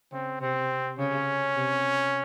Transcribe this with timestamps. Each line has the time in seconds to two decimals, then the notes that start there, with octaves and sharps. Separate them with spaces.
0.12 C#3 C4
0.41 C3 C4
0.98 C#3 C#4
1.56 C3